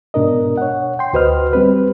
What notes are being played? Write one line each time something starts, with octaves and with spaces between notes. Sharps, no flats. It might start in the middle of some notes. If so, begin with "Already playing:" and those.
G#2 B2 D4 A#4 D#5
C#5 F#5
G5 C6
D2 F#4 B4 C5 D#5 F6
G3 C4 B4